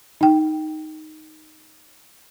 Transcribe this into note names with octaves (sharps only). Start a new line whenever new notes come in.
D#4 G5